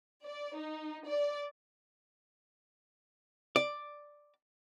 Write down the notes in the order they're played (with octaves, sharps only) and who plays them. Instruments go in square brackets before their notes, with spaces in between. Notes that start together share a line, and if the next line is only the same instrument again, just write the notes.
[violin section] D5
D#4
D5
[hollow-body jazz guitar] D5